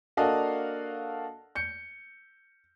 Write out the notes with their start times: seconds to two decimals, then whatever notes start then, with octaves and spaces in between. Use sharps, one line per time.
0.17 A#3 D4 F#4 A4 D#5 F5
1.55 G6 C#7